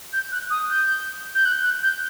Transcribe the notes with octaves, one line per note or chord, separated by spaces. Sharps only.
G6
F#6
D#6
G6
G6
F#6
F#6
G6